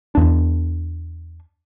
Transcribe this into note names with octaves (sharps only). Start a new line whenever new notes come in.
E2 D4